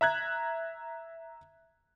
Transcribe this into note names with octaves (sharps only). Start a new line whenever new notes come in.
E5 A#5 F#6 G#6